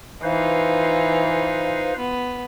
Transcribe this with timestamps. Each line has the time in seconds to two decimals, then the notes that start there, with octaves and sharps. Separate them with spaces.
0.23 E3 D#4 F4 B4 C5 F5
1.98 B3